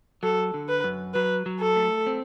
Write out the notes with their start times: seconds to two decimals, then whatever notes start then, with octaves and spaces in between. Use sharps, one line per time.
0.23 F#3 A4
0.54 D3
0.69 B4
0.84 F#2
1.14 F#3 B4
1.46 F#3
1.60 A4
1.76 A3
2.07 C4